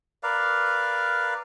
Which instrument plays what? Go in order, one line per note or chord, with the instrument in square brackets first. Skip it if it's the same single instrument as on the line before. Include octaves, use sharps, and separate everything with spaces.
[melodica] A#4 B4 D5 F5